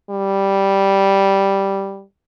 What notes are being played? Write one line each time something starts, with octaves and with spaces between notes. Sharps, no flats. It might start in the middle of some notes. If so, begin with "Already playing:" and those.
G3